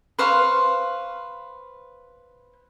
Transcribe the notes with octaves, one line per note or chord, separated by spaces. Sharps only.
B4 C5 F5 C#6